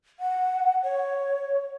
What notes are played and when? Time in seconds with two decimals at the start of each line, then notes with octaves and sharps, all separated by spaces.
0.20 F#5
0.83 C#5